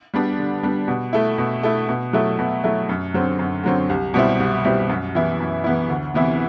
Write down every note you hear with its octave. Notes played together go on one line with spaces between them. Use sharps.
G3 B3 D4
D3
G3 B3 D4
B2
A3 E4
B2
A3 E4
B2
F#3 A3 E4
B2
F#3 A3 E4
F#2
D3 F#3 C4
F#2
D3 F#3 C4
C2
B2 G3 C4 E4
C2
B2 G3 C4 E4
F#2
E3 B3 E4
F#2
E3 B3 E4
D2
C3 E3 B3 E4